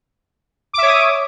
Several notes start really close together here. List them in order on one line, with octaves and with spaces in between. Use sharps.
D6 E5 C#5 D#6